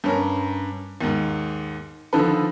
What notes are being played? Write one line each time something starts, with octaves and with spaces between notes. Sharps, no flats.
G2 C#4 A#4
D#2 G#2
D3 D#3 F3 D#4 A4 B4